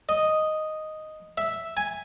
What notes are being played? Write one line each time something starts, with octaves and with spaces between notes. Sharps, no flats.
D#5
E5
G#5